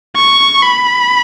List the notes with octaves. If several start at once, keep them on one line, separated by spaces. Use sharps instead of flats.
C#6
B5